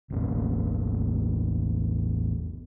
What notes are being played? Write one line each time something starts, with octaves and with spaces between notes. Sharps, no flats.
E1 A1 A#3 C#4